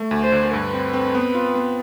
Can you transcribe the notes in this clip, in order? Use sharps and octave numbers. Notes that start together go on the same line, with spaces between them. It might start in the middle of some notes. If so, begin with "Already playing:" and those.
Already playing: A3
D2
C5
D3
G2 B4
C4
C4
B3
F4
B3